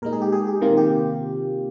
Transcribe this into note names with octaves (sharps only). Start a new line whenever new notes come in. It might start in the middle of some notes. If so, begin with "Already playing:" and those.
A#2 G#3 D#4 A#4
G#4
G4
G#4
G4
C3 D#3 A#3 F4
G4